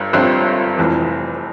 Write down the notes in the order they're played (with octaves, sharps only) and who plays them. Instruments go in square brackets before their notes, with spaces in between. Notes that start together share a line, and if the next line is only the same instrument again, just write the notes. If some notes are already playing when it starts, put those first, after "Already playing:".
Already playing: [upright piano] G1 G2
G1 G2 F3 C4
F1 F2 E3